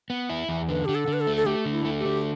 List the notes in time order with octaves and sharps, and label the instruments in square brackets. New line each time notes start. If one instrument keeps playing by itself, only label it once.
[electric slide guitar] B3
E4
E2
[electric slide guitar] D3 [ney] B4
[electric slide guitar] D3 [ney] G4
[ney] A4
[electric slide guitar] D3
[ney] B4
A4
[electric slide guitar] A3
[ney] A4
[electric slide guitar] A3 [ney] G4
[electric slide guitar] D3
[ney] E4
[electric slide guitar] A3
[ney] G4
[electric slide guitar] D3